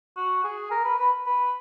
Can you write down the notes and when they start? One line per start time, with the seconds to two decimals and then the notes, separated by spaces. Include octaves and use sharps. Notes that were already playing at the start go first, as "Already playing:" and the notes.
0.16 F#4
0.44 G#4
0.71 A#4
0.85 B4
0.99 B4
1.26 B4